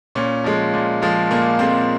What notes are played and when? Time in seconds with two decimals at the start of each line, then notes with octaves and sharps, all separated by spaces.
0.15 A#2 C#4
0.44 F3 G#3
0.73 A#2
1.02 F3 G#3
1.30 A#2 A#3
1.59 F3 G#3 C4